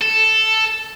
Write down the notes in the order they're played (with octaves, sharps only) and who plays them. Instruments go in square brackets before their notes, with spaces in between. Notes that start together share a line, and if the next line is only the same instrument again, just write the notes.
[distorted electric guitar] A4